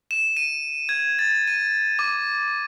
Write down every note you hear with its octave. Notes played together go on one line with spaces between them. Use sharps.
E7
D#7
G#6
A6
D#7
D6